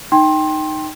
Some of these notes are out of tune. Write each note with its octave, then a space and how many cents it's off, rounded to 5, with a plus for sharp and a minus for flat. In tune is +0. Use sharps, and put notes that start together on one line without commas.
D#4 -10 G5 +0 C6 +20